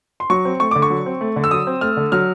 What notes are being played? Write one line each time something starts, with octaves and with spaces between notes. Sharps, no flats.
C6
F#3 C#6
C4
A3 C#6
D3 D6
C#6
F#3
C4
A3
D3
E6
F#3 D#6
C4
A3 F6
D3
F#3 F6